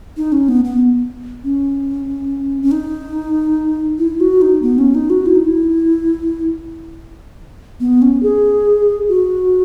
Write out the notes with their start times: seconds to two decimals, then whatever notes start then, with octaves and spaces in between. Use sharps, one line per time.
0.16 D#4
0.32 C#4
0.48 B3
0.64 B3
1.44 C#4
2.62 C#4
2.71 D#4
3.98 E4
4.20 F#4
4.41 D#4
4.62 B3
4.78 C#4
4.94 D#4
5.09 F#4
5.26 E4
5.35 D#4
5.44 E4
7.80 B3
8.02 C#4
8.22 G#4
9.08 F#4